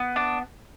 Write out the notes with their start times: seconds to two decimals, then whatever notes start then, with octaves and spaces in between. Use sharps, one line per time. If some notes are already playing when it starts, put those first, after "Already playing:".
Already playing: B3
0.16 D4